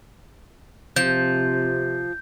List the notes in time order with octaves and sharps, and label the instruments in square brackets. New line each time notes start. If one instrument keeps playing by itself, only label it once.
[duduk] C3 [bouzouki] F3 [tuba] C4 [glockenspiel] G6